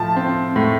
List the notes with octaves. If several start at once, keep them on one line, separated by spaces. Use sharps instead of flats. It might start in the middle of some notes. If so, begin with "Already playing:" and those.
Already playing: A2 F3 A5
C4
A2